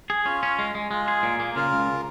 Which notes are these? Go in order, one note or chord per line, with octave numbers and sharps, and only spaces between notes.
G#4
C#4 F4
C#4
G#3
G#3
G#3 F4
G#4
A#2
A#3
C#3 F4 A#4
C#2